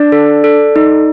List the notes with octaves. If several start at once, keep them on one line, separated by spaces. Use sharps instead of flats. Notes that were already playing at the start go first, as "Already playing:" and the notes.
Already playing: D4 D5
A4
A4
D#4